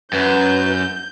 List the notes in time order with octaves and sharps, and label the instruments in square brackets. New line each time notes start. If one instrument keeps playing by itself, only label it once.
[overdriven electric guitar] F#2 [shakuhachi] B4 [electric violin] G6